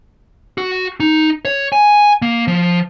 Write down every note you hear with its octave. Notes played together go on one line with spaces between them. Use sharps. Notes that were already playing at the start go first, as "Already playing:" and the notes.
F#4
D#4
C#5
G#5
A#3
F3